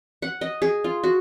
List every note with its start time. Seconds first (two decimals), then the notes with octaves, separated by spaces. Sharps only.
0.22 F#5
0.41 D#5
0.62 G#4
0.84 F4
1.04 F#4